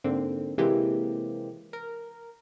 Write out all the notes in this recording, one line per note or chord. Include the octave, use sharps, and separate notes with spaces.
G#2 D3 A#3 C4
C3 E3 G#3 A#3 C4 G4
A#4